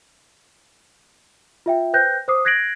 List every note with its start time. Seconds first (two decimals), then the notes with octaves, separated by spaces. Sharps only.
1.66 F4 E5 G5
1.93 B4 C5 G5 F#6 G6 A#6
2.28 C5 D6 D#6 C7
2.45 F#6 G#6 A#6 C7 D7 F#7